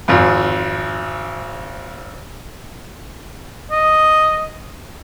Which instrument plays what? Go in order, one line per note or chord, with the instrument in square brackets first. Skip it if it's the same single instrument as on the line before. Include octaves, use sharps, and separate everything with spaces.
[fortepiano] G#1 F2
[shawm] D#5